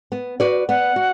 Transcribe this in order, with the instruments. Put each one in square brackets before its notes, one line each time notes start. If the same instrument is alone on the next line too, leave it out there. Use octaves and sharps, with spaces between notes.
[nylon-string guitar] B3
F#4 B4 D5
[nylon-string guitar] B3 [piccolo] F#5
[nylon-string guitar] F#4